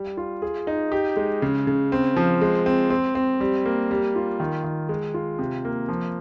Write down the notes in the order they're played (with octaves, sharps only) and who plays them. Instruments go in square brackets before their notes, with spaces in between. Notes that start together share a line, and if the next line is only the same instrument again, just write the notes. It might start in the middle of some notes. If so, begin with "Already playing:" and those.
Already playing: [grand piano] G3
F4
G#4
D#4
G4
G#3
C#3
C#3
C4
F3
G#3
C4
C4
C4
G3
A#3
G3
F4
D#3
D#3
G#3
F4
C3
A#3
F3